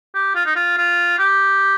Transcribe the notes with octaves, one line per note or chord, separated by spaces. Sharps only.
G4
F4
D#4
F4
F4
G4